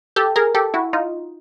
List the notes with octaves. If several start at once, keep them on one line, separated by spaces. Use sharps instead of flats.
G4 A4
G#4 A#4
G4 A4
E4 F#4
D#4 F4